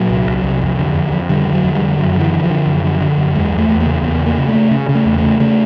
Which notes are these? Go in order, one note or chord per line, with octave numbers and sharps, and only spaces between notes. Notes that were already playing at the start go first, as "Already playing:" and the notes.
Already playing: A#2 F#3
C2
C2
C2
F2
D3
F2
F2
D3 G3
D3
F#3
F2
G3
D3
F#2 F#3
D3
E3
D3
F3
D3
F#2
D3
D3
F#2
E2 G#3
E2
A3
E2
A#3
C#3
E2 B3
C#3
A#3
C#3
A3
C#3
C#3
C#3
A3
E2
A3
C#3
C#3 A3